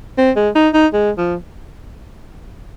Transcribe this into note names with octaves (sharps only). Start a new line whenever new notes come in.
C4
G#3
D#4
D#4
G#3
F3